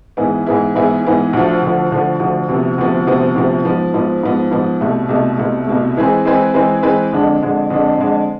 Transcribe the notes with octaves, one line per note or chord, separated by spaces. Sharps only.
G#2 E3 B3 E4 G#4
G#2 E3 B3 E4 G#4
G#2 E3 B3 E4 G#4
G#2 E3 B3 E4 G#4
D2 D3 F3
D2 D3 F3
D2 D3 F3
D2 D3 F3
D2 C3 F3 B3
D2 C3 F3 B3
D2 C3 F3 B3
D2 C3 F3 B3
G#2 F3 B3
G#2 F3 B3
G#2 F3 B3
G#2 F3 B3
C2 B2 A3
C2 B2 A3
C2 B2 A3
C2 B2 A3
E3 G#3 C4 G#4 B4
E3 G#3 C4 G#4 B4
E3 G#3 C4 G#4 B4
E3 G#3 C4 G#4 B4
F2 D3 G#3 D4
F2 D3 G#3 D4
F2 D3 G#3 D4
F2 D3 G#3 D4